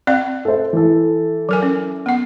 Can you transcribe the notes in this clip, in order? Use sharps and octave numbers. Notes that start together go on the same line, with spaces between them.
C4 D5 F5
A4 C5
E3 A4
F#3 A#4 G#5
C#4
B3 F#5